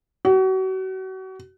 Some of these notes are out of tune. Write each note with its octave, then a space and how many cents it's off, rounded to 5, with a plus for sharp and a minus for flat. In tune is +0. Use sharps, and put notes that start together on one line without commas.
F#4 +35